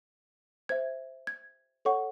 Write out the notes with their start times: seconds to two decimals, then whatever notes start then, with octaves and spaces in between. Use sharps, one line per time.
0.69 C5 E5 G#6
1.27 G#6
1.85 A4 C#5 F#5 C#6